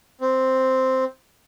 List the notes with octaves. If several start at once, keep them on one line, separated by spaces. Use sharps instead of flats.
C4